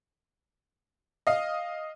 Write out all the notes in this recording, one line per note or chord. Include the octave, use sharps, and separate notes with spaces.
D#5 F5